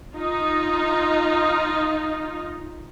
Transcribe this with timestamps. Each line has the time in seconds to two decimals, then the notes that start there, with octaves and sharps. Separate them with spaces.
0.14 D#4 F4